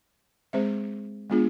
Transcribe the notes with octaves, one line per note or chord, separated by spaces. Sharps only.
G#3 C4 G#4 C5 E5
G#3 B3 D4 F4 G#4